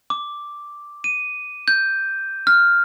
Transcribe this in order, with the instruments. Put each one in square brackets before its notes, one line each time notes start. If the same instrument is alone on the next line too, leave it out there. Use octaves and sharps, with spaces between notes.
[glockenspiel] D6
D#7
G6
F6